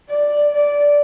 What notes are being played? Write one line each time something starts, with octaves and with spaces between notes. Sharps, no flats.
D5
D5